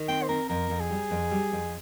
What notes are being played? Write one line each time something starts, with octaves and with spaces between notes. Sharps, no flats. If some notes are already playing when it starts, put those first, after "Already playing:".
Already playing: D#3
C4 G5
C5
C4 A#4
F2 A#4
F2
G#4
G3
F2
G3
F2